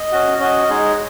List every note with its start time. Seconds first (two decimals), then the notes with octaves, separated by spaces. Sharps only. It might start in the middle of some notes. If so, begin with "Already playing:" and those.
Already playing: D#5
0.12 C#4 F#4
0.40 C#4 F#4 D#5
0.69 G#3 D#4 G#4